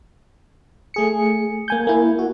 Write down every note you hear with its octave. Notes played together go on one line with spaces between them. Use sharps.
A3 G#4 C#7
A#3 G#5 G6
A#3 E4
F#4